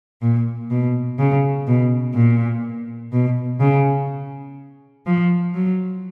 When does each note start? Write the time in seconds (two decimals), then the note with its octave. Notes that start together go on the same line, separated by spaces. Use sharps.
0.22 A#2
0.70 B2
1.18 C#3
1.67 B2
2.14 A#2
3.12 B2
3.60 C#3
5.06 F3
5.54 F#3